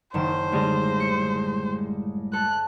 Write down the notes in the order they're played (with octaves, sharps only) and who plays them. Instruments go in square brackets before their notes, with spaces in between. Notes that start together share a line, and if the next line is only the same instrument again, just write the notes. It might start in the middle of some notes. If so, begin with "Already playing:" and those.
[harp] F#1 D#3 E7 [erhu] C5
[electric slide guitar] A2 G3 G#3 [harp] D3
[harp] C#7
[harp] A4 [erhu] F#6